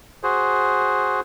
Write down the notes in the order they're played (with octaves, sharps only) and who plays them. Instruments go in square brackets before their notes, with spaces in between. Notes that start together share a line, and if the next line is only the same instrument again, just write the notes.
[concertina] F#4 G#4 C5